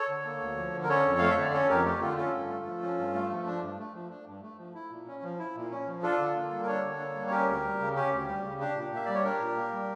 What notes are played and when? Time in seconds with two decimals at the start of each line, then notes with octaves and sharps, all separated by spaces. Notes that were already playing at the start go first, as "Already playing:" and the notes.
Already playing: A4 C#5
0.09 D3
0.25 A#3
0.41 D2
0.57 F3
0.74 D3
0.83 A#4
0.89 C#4 A4 C#5
1.06 F2
1.19 A3 F5
1.31 E5
1.38 D3 D5
1.53 C#4 A4 C#5
1.70 F2 G4 A#4
1.85 A3 G4
2.01 D3 F4 A4
2.17 C#4 F4 A4
2.34 G2
2.49 A3
2.66 F3
2.82 C#4
2.98 G2
3.14 A3
3.30 F3
3.46 D4
3.63 G2
3.79 A3
3.94 F3
4.10 D4
4.26 G2
4.42 A3
4.58 F3
4.75 E4
4.90 A#2
5.07 C#4
5.22 F3
5.39 E4
5.55 A#2
5.71 C#4
5.86 F3
6.02 D4 F4 A4
6.19 D3
6.36 A#3
6.51 G3
6.63 A#4
6.67 D4 A4 C#5
6.83 D3
6.99 A#3
7.15 G3
7.27 C#5
7.31 C#4 G4 A#4
7.48 D2
7.64 G3
7.80 C#3
7.96 C#4 G4
8.12 D2
8.28 G3
8.44 C#3
8.60 D4 G4
8.76 A#2
8.92 A#3 E5
9.05 G3 D5
9.14 C#5
9.24 D4 G4 A#4
9.40 A#2
9.56 A#3
9.73 G3